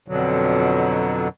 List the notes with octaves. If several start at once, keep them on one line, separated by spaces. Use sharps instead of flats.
F2 B2 D3 F#3